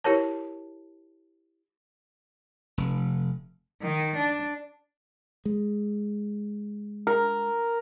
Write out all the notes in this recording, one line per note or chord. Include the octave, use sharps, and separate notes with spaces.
E4 G4 A#4 C#5 A5
F1
D#3
D4
G#3
A#4